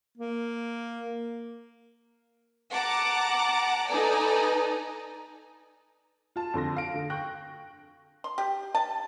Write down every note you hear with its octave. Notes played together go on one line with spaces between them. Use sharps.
A#3
F#5 A5 A#5 D6
D#4 A4 B4 D5 G#5 A#5
F4 A5
F2 D3 C6 A#6
F5 D7
D3
G5 C#6 F#6 A#6
C6
G4
A5